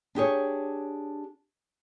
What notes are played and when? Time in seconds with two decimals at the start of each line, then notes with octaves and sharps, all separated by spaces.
0.15 D4 G4 G#4 C#5